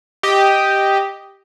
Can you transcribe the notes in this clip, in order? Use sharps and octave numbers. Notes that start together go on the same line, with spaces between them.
G4 D#5